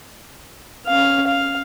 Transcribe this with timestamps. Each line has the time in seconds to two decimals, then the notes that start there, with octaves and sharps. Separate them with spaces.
0.87 C#4 F5
1.27 F5